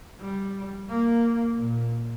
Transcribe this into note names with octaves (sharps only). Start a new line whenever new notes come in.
G3
A#3
A#2